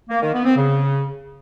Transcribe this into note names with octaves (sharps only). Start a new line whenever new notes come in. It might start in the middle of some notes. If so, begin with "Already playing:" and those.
A#3
D#3
B3
C4
C#3